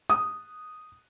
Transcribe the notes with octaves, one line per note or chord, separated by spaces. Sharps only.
D#6